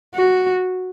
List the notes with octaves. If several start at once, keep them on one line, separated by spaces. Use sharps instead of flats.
F#4